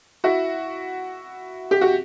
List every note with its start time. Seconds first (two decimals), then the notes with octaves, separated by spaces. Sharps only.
0.24 E4 F#4
1.71 G4
1.81 F#4